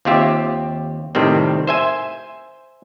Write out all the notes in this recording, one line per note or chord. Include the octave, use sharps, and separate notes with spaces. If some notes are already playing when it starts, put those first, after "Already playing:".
D#2 C4 F4 G4 E5
A2 C3 D#3 G3 C4
C5 E5 G#5